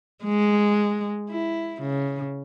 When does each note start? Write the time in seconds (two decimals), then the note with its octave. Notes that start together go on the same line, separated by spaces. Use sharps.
0.24 G#3
1.30 E4
1.81 C#3